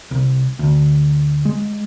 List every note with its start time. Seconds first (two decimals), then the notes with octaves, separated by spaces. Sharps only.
0.11 C2
0.59 D2
1.45 G#3